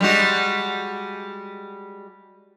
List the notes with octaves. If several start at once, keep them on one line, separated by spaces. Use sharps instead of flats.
G3 G#3 F#4